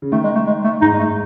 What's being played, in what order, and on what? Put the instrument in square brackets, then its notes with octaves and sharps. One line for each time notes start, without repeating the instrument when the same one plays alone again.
[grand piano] C#3
[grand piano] D#3 [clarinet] A3
[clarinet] G#3
A3
G#3
A3
[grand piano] G#2 [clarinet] D#4
[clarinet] G#3
A3